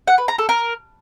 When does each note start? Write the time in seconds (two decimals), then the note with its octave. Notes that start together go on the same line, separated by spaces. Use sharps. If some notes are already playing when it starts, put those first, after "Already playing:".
0.08 F#5
0.18 B4
0.28 A#5
0.38 A4
0.49 A#4